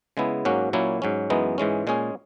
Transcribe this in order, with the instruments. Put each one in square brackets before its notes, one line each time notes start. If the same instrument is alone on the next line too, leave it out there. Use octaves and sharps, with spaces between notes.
[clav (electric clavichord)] C#3 G#3 B3 E4
G#2 F#3 A#3 C#4 F#4
A#2 F#3 A#3 C#4 E4
G#2 F#3 C#4
F#2 E3 G#3 B3 D#4
G#2 E3 G#3 C#4
A#2 G#3 C#4 G#4